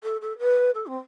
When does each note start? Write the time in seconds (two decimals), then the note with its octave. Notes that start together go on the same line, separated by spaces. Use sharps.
0.03 A4
0.21 A4
0.39 B4
0.74 A4
0.86 C4